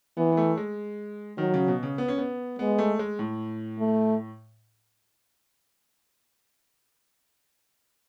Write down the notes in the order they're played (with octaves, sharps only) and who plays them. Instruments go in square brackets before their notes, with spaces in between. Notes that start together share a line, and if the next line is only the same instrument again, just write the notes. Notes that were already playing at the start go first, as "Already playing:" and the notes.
[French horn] E3 [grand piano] B3
[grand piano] B3
A3
G#3
[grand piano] D#3 [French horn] F#3
[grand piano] C#3
B2
C#3
B3
C#4
B3
[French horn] G#3 [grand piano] B3
[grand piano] A3
G#3
A2
[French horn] A3